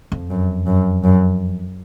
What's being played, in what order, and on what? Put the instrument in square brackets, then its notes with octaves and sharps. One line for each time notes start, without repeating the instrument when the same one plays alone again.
[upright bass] F2
[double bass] F#2
F#2
F#2